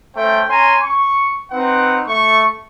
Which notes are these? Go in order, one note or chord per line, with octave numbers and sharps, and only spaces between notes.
A3 C#4 C5 G5
C#4 G#5 A#5 C6
C#6
C4 D#4 B4 F#5
A3 C#6